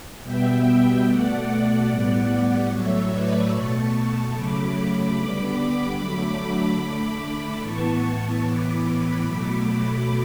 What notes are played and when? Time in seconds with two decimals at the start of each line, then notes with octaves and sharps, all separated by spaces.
0.23 B2 G3 B3 E5 G5
1.05 B2 A3 D5 F#5
1.87 A2 G3 B3
2.69 A2 F#3 A3 C#5 E5
3.10 B4 D5
3.51 B2 A3 A5 C#6
4.33 C#3 F#3 A3 B5 D6
5.15 D3 G3 B3
5.96 D3 F#3 A3 B5 D6
6.79 D3 A3
7.60 A2 E3 B3 A5 C#6
8.42 A2 E3 B3 B5 D6
9.24 B2 F#3 A3